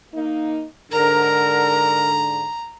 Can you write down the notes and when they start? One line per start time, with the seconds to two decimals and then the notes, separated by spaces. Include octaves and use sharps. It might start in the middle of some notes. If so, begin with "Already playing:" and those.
0.14 A#3 D#4
0.92 G#2 D3 A#4 A#5